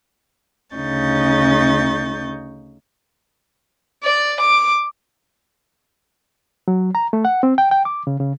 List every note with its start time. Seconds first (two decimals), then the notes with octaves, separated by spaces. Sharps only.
0.75 D2 C#3 D#4 C#6 G6 A6
4.03 D5
4.40 D6
6.68 F#3
6.95 A#5
7.13 A3
7.25 F#5
7.43 C4
7.58 G5
7.71 G5
7.85 D6
8.07 C#3
8.20 C#3